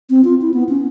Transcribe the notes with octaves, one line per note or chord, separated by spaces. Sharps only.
C4
F4
E4
B3
C#4